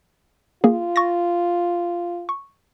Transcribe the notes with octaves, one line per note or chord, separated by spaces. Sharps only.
A#3 F4 G#4
C#6 A6 A#6
C#6